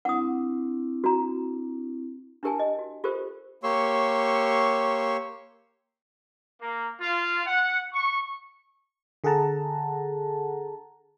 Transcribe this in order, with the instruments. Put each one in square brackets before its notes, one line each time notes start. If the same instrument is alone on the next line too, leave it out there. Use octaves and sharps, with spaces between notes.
[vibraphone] C4 D4 E4 [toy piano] F#5 D#6
[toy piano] F#4 A#5
D4 E4 G4 A#4 G#5 A5
D#5
F#4
F4 G4 A4 A#4 C5
[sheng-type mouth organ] A#3 G4 C#5 C6 C#6 E6
[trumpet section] A#3
F4
F#5
C#6
[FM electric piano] D3 G#4 A4 F#5 A5 A#5